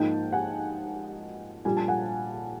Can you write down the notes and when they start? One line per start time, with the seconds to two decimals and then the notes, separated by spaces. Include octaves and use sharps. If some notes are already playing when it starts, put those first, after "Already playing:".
Already playing: G#2 F3 A#3 D#4 G5 A5
0.32 F#5 G#5
1.65 A#1 A#2 G3 G#5
1.77 A5
1.88 F#5 G#5